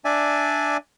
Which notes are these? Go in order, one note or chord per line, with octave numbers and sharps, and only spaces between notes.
D4 D5 E5 G#5